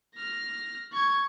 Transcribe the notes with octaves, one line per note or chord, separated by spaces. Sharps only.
F6 A#6
C#6 G#6